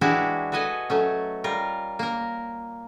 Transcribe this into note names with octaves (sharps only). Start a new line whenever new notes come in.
E3 G#3 D4 E4 F#4 G4
F#4 A4 B4 D#5 G#5
F#3 A3 C#4
G3 F4 A#4
A#3 A#4